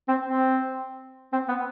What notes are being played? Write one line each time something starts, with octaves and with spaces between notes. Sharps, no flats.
C4
C4
C4
B3